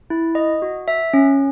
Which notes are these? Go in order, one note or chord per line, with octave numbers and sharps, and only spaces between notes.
E4
D#5
F#4
E5
C#4